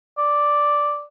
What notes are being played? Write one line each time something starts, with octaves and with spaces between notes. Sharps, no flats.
D5